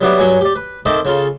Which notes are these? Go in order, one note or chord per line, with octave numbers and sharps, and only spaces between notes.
F#3 G3 B3 D4 E4 F#4
G2 F#3 F#4 C#5 G#5
G4 D5
B4
D#3 C4 A4 D#5 E5 D6
C#3 F4 A4